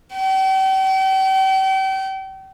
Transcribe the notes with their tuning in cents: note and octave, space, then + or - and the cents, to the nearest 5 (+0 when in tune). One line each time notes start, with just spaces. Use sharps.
G5 -40